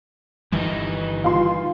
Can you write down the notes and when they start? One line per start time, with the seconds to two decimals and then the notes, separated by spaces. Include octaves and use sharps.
0.52 G1 D#3 E3 G3 D#4
1.24 F4 C6